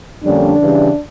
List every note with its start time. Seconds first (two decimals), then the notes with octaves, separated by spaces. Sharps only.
0.23 F2 D3 G3 A#3 C#4 D4
0.59 C#3 E3 G3